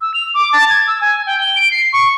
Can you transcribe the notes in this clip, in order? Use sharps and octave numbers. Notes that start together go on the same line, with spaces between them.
E6
F7
D6
A5
G#6
E6
G#5
G5
G7
D7
C7
C#6